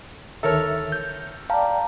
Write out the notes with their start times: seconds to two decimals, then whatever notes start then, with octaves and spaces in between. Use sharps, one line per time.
0.43 D2 D#3 A4 A#4 C#5 E5
0.92 G6
1.50 D5 F5 G5 A5 A#5